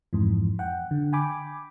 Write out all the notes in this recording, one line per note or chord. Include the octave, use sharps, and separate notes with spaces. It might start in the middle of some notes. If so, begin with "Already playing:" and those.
F2 G#2 E3
F#5 G5
D3
G5 G#5 B5 D6